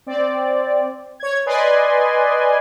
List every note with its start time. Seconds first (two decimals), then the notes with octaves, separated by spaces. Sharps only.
0.06 C4 D5
1.20 C#5 G#6
1.46 B4 D5 D#5 G#5 C6